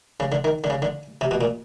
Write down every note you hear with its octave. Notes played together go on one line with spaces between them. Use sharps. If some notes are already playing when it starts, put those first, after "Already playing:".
C#3
D3
D#3
D3
C#3
D3
C3
B2
A#2